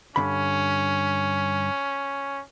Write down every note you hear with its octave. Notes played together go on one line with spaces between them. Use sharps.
G2 D3 C#4 B5